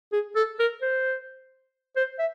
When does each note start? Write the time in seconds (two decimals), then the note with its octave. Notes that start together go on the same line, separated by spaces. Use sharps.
0.13 G#4
0.36 A4
0.59 A#4
0.82 C5
1.96 C5
2.19 E5